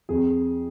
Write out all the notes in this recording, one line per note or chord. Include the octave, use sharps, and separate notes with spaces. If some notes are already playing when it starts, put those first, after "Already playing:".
F2 G#4